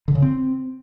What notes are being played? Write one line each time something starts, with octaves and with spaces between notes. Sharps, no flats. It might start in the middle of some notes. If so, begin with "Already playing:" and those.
D3
C#3
C4